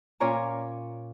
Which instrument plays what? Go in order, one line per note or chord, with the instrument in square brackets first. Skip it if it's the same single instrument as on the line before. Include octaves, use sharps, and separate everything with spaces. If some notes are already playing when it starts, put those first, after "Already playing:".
[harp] A#2 C#4 F4 C#5 D5 A#5